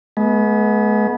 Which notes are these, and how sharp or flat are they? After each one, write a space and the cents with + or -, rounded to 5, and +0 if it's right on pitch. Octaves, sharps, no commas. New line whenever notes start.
G#3 +40 B3 -15